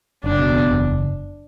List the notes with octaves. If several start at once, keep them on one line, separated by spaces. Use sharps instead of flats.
F#1 D4
B2
E2
F#1